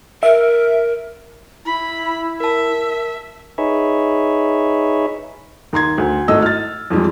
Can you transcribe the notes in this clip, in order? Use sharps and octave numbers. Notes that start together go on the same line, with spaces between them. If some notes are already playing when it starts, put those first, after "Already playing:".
A#4 E5
E4 B5
A#4 E5 A5
D#4 G#4 B4 C#5 E5
D#2 A#5 C6 G#6
D2
G#1 A2 A3 D#5 E6
F6 A6
F2 E3 G3 G#3